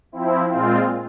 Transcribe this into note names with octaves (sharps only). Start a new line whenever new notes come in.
F3 C4 E4
A#2 G#3 C4 F4